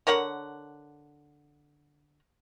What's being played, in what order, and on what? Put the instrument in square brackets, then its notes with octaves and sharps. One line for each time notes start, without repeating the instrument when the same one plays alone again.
[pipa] D3 A#4 C#5 F#5